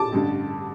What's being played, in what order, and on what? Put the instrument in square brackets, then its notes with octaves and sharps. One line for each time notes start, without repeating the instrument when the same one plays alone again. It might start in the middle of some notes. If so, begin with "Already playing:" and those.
Already playing: [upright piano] A5 D6
A1 G2 D3